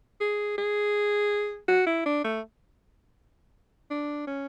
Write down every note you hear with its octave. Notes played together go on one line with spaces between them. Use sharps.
G#4
G#4
F#4
E4
D4
A3
D4
C#4